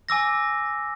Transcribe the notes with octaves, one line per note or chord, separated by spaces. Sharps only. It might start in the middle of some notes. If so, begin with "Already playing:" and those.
G#5 D6 E6 A#6